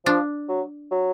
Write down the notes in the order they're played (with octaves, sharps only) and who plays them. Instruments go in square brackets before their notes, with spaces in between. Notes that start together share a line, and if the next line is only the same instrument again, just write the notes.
[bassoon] F3 [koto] D4
[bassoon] F#3
F#3